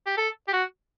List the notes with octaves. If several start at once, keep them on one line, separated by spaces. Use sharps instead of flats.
G4
A4
G4
F#4